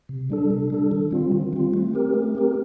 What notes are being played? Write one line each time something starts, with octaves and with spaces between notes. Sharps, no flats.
C3
G3 D4 A4
C3
G3 D4 A4
D#3
G3 C4 F4
D#3
G3 C4 F4
A3
C4 G4 A#4
A3
C4 G4 A#4